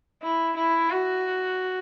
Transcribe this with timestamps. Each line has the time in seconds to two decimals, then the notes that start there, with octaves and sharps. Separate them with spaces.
0.23 E4
0.56 E4
0.91 F#4